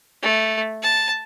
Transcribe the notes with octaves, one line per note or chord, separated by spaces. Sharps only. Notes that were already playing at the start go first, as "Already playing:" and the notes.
A3
A5